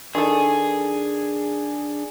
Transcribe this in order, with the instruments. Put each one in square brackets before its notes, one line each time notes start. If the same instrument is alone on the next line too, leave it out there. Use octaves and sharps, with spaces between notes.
[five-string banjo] D#3 A4 [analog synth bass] D4 [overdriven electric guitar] G#4